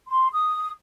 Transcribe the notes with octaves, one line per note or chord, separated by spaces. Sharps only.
C6
D#6